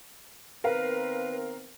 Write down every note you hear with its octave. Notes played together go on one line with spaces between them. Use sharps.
D#3 B3 C4 A#4 B4 F5